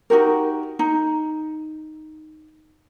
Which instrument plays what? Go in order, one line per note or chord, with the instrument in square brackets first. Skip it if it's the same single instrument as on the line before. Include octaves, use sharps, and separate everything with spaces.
[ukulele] D#4 F#4 G4 A#4
D#4